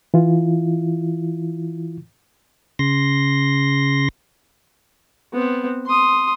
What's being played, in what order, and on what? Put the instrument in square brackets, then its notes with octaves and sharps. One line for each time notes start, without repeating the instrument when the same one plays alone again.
[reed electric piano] E3 E4 F4
[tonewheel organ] C#3 C6 A#6
[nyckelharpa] B3 C4
C6 D#6